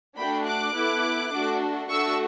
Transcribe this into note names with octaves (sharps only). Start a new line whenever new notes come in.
A3 D4 F#4 G5 B5
D6 F#6
B3 E4 A4
A3 D4 F#4 A4
A3 D4 F#4 A4 C#6 E6